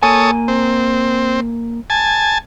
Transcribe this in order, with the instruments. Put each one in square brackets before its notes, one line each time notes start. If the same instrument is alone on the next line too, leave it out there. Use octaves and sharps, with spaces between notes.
[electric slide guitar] A#3 G#5 [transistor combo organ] A4 C#5 D#6
[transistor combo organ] C4
G#5 A5